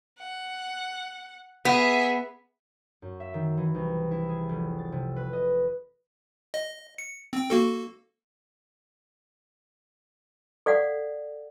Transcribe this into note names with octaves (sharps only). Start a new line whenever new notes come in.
F#5
B3 G#4 E5
F#2
E5
D#3
E3
C2
E4
G#4
F1
A6
C3
B4
D#5
D#5
C#7
C4 G5
A#3 F#4 A4
A4 D5 F5 F#5